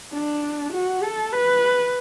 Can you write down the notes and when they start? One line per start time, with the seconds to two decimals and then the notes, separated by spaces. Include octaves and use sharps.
0.12 D4
0.73 F#4
1.03 A4
1.33 B4